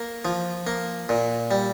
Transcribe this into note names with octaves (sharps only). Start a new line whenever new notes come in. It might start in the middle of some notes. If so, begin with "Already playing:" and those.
Already playing: A#3
F3
A#3
A#2
G3